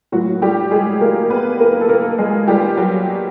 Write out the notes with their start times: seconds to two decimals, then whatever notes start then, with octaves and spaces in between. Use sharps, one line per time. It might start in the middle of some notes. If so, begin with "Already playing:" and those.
0.12 A2 F#3 A#3 F#4
0.42 G3 G4
0.71 G#3 G#4
1.01 A#3 A#4
1.30 B3 B4
1.60 A#3 A#4
1.81 A4
1.89 A#3 A#4
2.18 G#3 G#4
2.47 G3 G4
2.77 F#3 F#4